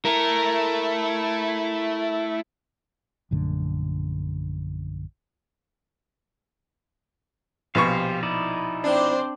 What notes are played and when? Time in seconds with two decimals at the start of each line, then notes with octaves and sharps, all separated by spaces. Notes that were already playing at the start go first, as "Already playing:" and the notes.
0.05 A3 E4 A#4
3.31 A#1 F#2 D3 A3
7.75 A#1 B2 G4 C5 F5 C#6
8.23 D#4 E4 D5
8.84 C4 D4 C5